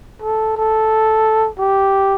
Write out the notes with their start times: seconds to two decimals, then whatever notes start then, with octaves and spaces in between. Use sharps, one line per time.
0.22 A4
0.57 A4
1.58 G4